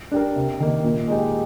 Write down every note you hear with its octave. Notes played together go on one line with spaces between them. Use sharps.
D4 G4 A#4
C3
D#3 A#3
A#2
G#3 D#4 G4